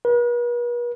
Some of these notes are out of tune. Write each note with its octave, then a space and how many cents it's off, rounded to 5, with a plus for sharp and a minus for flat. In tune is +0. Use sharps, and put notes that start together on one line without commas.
B4 -45